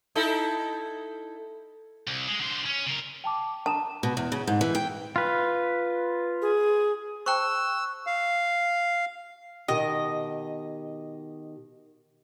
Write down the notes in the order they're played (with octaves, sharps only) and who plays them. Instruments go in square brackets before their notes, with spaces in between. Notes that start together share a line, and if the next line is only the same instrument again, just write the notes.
[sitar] D#4 E4 A4
[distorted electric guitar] C2
G#3
D3 C5
C#4
C#3 A#4
[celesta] G5 A5 D6
[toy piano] A5 [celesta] A#5 D#6 E7
[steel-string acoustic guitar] B2
E2
C#3
G#2
E3
G5
[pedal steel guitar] F4 B4
[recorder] G#4
[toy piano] C5 G5 A5 [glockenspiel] C#6 F#6 [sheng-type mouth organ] E6
[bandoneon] F5
[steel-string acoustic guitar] B2 D#3 G4 [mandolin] D#5